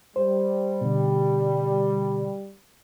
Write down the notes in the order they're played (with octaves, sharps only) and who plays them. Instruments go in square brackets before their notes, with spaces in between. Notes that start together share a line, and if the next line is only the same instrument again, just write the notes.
[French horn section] G3 [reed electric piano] C5
[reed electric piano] B2 D3